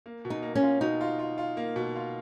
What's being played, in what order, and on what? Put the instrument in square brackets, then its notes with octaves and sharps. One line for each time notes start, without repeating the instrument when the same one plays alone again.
[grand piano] A#3
B2
[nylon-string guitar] D#4
[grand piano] A#3
[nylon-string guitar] C#4
[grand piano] F4
[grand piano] B2 [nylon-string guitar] D#4
[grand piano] F4
F4
F4
A#3
B2
F4